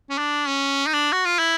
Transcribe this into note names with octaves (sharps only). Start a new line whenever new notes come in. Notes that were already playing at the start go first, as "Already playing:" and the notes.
C#4
D4
C#4
D#4
D4
F#4
F4
E4